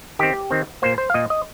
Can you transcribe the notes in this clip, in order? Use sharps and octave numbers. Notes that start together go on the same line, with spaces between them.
D#3 C4 G4
D#3 C4
A#2 A#3 C5
C5
F5
A#2 A#3 D#5
D#5